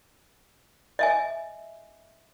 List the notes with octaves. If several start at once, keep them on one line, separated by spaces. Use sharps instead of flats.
D#5 E5 G#5